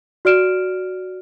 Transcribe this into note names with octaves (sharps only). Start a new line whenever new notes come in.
F#4 D5 F6 D7 E7